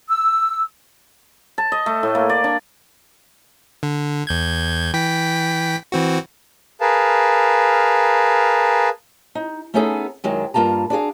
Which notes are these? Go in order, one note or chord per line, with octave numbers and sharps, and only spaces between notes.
E6
A5
D#5
A3
A2
A#3
D5
D4
D3
E2 G6 G#6
E3 G5 B6
E3 C4 F#4
G#4 A#4 B4 F5 A5
D#4
A3 B3 C#4 D#4 G#4 A4
F#2 D#3 F#3 G#3
G2 A#3 F4 A5 A#5
D4 F#4 G#4 F5